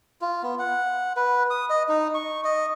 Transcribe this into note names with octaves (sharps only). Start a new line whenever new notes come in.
F4
B3
F#5
B4
D#6
D#5
D#4
C#6
D#5